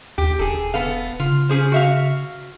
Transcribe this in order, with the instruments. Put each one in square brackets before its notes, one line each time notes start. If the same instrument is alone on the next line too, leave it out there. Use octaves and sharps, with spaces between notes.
[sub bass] D#2 [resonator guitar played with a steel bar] G4
[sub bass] E1 [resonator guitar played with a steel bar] G#4 A4
[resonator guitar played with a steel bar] B3 A4 F5
[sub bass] C#3 [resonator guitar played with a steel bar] F4
[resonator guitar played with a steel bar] C#4 G#4 C5
F#4 E5 F5